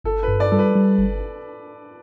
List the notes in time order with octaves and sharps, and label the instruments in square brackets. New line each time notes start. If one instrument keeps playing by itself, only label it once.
[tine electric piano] G1 [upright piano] A4
[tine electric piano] G2 [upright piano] B4
[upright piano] D5
[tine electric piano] G3 [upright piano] A4
[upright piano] B4
[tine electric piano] G3
G1